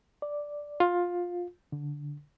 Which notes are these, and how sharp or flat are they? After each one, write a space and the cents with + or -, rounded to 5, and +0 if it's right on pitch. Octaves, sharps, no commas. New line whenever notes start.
D5 +0
F4 +15
D3 -10